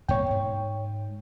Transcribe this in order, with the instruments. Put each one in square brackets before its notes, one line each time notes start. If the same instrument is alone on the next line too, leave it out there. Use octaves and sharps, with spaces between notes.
[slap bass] G2 B2 A#3 [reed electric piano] C#5 G5
[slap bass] G#2